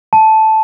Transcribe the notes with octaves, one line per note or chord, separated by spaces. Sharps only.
A5